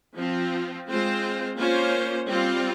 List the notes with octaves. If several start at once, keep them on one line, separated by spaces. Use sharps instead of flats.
F3 C4 F4
G#3 C4 F4 C5
A#3 C#4 F4 C5
G3 C4 F4